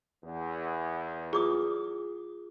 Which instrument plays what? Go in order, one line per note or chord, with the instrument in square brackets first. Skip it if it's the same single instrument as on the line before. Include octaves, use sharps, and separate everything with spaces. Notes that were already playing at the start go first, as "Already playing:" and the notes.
[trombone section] E2
[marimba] F4 [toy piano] G#4 D6 D#6